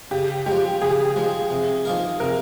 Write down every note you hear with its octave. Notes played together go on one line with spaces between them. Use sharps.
C#3 G4
F3 G#3 G4
C#3 G#4
F3 G#3
C3
F3 A#3 D#4 A#4
C3 A#4